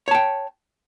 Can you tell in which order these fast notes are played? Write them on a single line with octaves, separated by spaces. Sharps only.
C#5 A5 G5